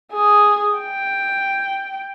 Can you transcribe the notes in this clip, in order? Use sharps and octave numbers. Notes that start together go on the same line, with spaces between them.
G#4
G5